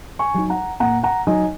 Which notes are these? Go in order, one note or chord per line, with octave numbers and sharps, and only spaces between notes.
G#5 C#6
F#3 D#4
F#5 A#5
A#2 F#5 A#5
F#5 A#5
F#3 D#4 D#5 G#5